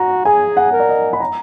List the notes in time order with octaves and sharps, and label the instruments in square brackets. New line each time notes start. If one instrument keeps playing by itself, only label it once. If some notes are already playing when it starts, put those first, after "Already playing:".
Already playing: [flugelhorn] F#4 [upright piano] A#5
[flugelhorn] G#4 [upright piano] G#5
[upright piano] F#5
[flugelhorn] A#4
[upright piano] D5
D#5
B5
A#5